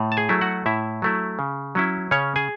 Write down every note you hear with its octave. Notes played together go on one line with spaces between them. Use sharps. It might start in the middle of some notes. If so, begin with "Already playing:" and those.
Already playing: A2
A5
G#4 G#5
F#3 A3 E4
F#4 F#5
A2 E4 E5
F#3 A3 E4
C#3
F#3 C#4 E4
C#3 C#4 C#5
G#4 G#5